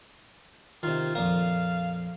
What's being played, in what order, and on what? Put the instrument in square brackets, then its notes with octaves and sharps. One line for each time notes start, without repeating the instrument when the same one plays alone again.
[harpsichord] C3 D#3 [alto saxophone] F4
[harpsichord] F2 A#2 A#4 [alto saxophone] F5